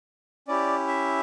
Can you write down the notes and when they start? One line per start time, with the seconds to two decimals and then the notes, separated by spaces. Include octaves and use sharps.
0.48 C#4 E4 G4 D5
0.87 E5